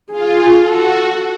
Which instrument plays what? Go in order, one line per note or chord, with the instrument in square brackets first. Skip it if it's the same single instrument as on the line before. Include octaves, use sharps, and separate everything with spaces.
[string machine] F4 [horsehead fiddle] G#4
[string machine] F#4 [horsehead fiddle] A4